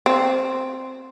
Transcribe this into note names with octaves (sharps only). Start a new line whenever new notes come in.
C4